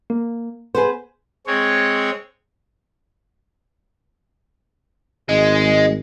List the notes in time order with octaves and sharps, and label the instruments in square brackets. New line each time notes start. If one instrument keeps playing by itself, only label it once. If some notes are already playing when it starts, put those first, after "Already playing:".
[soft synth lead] A#3
[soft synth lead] B3 [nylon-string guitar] G#4 B4 C5
[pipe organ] G#3 C4 C#5
[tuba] G#1 [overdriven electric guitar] G#3